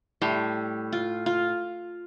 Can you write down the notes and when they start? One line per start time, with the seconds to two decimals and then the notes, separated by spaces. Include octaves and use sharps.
0.22 A2 G3
0.92 F4
1.26 F4